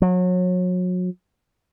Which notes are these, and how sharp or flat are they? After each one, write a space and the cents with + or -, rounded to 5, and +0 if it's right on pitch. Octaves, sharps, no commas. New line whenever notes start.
F#3 -30